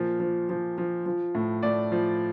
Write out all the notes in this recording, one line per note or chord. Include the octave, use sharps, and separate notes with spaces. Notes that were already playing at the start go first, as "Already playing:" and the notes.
Already playing: A#2 F3
F3
F3
F3
F3
A2
A2 D5
F3